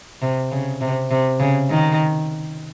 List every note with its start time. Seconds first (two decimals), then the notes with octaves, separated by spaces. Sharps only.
0.22 C3
0.51 C#3
0.81 C3
1.11 C3
1.40 C#3
1.70 D#3